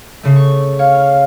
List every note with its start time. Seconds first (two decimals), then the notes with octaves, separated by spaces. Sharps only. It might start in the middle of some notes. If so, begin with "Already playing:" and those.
0.23 C#3 A3
0.36 C#6
0.79 C#5 F5